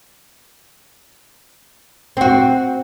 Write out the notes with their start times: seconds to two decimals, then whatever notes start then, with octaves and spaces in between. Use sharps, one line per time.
2.17 C4 F#4